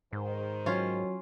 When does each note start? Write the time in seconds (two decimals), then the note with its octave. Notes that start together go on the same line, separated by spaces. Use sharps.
0.13 G#2 D#3 C5
0.66 F#3 C#4 F4